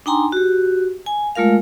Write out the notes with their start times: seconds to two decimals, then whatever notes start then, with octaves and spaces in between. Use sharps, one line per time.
0.06 D4 D#4 G5 G#5 A#5 C6
0.32 F#4 G4
1.06 G#5
1.35 G#3 A3 F4 A#4 F5